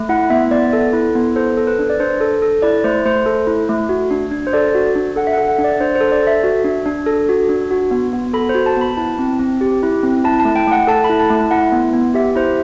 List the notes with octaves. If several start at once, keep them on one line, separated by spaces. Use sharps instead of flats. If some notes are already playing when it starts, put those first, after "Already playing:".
Already playing: A3
E4 F#5
B3 E5
B3 D5
A4
E4
B3
A4 C5
A4
B4
D4
D5
D4 C5
A4
A4
E4 D5
A3 C5
A3 C5
A4
E4
A3
F#4
D4
D4
C5
A4 D5
F#4
D4
A4 F#5
E5
F#5
A4
F#5
D4
D5
D4 C5
C5
A4
D5
A4 E5
F#4
D4
D4
A4
F#4
D4
F#4
B3
B3
A4 B5
C5
F#4
A5
B3 B5
E4 A5
C4
C4
G4
E4
C4
E4 A5
A5
A3
G5
A3 F#5
A4 A5
B5
E4
A5
A3
E4 F#5
B3
B3
G4 E5
E4 C5